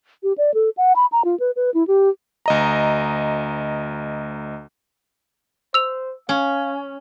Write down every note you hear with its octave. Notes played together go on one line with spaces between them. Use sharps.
G4
D5
A4
F#5
B5
A#5
F4
B4
B4
E4
G4
D2 D#5 A#5
C5 E6 F7
C#4 F5